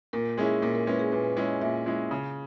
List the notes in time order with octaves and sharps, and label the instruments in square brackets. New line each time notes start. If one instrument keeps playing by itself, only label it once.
[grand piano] A#2 [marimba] A#4
[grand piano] G#3 C#4 E4 [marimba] G#4
[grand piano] A#2 [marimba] A#4
[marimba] A#4
[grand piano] G#3 C#4 E4 [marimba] B4
[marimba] G#4
[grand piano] A#2 [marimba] B4
[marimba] B4
[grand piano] G#3 C#4 E4 [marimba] C#5
[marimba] D#5
[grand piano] A#2 [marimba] E5
[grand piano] G#3 C#4 E4
C#3